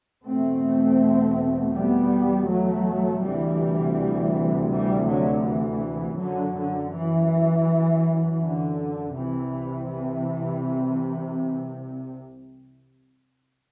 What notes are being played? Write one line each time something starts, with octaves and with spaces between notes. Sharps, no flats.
E2 B2 A3 C4
G3 B3
F#3 A3
D2 C3 E3 G3
E3 G3
D3 F#3
E3
F#2 D3 F#3
D3
E3
D3
C2 C3 E3
E3